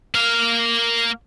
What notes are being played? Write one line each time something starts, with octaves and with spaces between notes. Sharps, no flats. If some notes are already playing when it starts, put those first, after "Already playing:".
A#3 F5